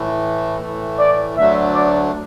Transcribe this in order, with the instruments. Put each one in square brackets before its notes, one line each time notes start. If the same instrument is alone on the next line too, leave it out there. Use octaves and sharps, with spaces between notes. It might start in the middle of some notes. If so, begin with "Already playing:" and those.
Already playing: [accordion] A2 E3 A3
A2 E3 A3
[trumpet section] D5
[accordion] D2 D3 F#3 A3 D4 [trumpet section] E5
[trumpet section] D5